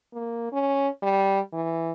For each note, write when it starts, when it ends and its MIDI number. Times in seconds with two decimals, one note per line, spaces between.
0.13 0.51 58
0.52 0.88 61
1.03 1.40 55
1.53 1.92 52